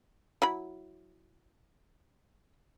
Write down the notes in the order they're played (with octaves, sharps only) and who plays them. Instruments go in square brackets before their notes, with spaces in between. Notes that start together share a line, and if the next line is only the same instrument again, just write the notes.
[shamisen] F#3 E4 B5